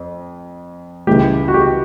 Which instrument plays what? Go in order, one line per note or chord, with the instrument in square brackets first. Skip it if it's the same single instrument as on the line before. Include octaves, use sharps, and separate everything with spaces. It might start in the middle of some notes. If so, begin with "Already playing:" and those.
Already playing: [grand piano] F2
C#2 C#3 E3 G3 G4
F#4
G4